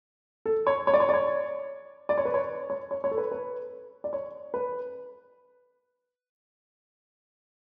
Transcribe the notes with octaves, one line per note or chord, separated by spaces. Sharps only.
A4
C#5
C#5
D5
C#5
D5
C#5
D5
C#5
B4
C#5
C#5
C#5
C#5
A4
B4
B4
D5
C#5
B4